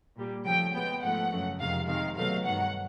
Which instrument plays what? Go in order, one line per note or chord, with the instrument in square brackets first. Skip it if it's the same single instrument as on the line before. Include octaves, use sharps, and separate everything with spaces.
[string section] A#2 G3 A#3
C#3 F3 A3 G5
B2 G#3 B3 G5
G#2 F3 A3 F#5
F#2 C#3 F#3 A3
F2 C3 D#3 G#3 F5
C3 D#3 G#3 F5
B2 F#3 A3 F5
G2 D#3 F#3 F#5